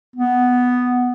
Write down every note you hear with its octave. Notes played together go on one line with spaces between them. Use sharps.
B3